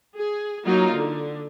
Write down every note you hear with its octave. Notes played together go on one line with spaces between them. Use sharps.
G#4
F#3 A#3 D#4 F4
D3